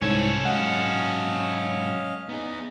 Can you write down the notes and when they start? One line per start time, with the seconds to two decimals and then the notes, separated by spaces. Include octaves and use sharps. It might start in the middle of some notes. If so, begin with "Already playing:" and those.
0.02 C2 G#2 C#4 A4 C#5 G#6
0.45 G#2 F#3 D#5 F5 F#5
2.29 B3 D#4 G#4